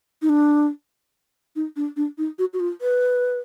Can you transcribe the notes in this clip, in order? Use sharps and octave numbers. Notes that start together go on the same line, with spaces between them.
D#4
D4
D#4
D4
D4
D#4
F#4
F#4
F4
B4